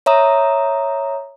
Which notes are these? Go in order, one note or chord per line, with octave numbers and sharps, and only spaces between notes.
C#5 E5 A#5 D#6